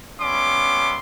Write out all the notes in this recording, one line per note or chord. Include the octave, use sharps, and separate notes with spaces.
G3 B3 C#4 E5 C6 D6